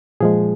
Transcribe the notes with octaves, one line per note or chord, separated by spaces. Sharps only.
A#2 F3 G#3 G#4